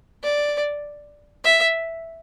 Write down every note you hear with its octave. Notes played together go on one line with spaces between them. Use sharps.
D5
E5